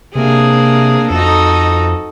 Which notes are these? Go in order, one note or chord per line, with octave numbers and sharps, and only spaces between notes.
C3 A#3 D4 G#4
F2 D#4 F#4 A4